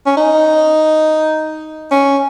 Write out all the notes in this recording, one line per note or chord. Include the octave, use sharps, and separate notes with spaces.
C#4
D#4
C#4